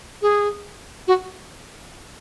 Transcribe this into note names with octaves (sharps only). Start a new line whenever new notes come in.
G#4
F#4